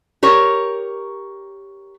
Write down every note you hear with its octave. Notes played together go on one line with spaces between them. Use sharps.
G4 A#4 C#5